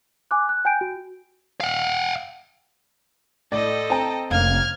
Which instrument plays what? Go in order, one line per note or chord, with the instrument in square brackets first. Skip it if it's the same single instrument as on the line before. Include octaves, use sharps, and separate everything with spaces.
[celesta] G#5 D6 F#6
F#6
G5 G#5 G6 D7
F#4
[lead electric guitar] F5 F#5
[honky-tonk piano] A2 [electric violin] A4 D#5 [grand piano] D5
[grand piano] C4 A#5 [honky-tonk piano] G5 A5
[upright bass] F1 [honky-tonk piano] A#3 C#4 F5 [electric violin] F6 G#6